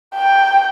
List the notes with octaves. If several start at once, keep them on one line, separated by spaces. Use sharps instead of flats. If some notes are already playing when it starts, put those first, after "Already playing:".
G5